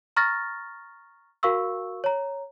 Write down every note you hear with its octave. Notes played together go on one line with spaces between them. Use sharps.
A#5 C#6 F6 A6 A#6
F#4 A#4 F5 C#6 E6
C#5 A#5